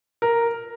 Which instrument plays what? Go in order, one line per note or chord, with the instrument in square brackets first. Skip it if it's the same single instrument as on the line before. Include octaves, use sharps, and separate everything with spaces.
[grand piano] A#4